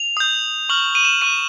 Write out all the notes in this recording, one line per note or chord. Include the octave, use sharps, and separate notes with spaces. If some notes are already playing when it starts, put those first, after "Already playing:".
Already playing: F7
D#6 G6
C#6 F6 F#7
D#7
E7
C#6 F6 D#7